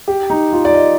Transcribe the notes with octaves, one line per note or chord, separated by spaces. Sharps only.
G4
D#4
F4
D5
D#5